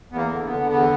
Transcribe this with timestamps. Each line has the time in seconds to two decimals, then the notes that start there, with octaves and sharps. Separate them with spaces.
0.10 E2 B3
0.16 A#3
0.30 D3
0.44 B3
0.50 D3
0.70 E2 B3